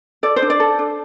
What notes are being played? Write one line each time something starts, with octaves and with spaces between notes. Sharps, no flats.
A4 D5
C5
D4
D5
A4
D4